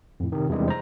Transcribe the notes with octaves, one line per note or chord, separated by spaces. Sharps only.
F2 A2
C3 D#3
E2 C3 E3 G3 G#3 D4
C5 A#5